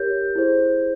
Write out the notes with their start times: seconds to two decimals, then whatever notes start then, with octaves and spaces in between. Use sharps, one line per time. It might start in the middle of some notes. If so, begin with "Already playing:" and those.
Already playing: G4 A#4 C#5 G6
0.35 E4 G#4 C5